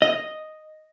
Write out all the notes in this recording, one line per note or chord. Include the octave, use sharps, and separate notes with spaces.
D#5